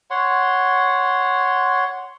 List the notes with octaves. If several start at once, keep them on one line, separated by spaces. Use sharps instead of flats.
C#5 F#5 C6